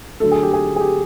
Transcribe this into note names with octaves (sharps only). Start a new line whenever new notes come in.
D3 F#3 A3 A4
G#4
G4
G#4
G#4
G4